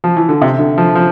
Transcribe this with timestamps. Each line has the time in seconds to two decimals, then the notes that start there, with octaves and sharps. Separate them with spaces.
0.04 F3
0.17 E3
0.29 D3
0.42 C3
0.59 D3
0.78 F3
0.95 F3